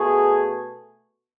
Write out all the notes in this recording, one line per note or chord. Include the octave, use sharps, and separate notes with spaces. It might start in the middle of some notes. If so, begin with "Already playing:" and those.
Already playing: B2 A3 G#4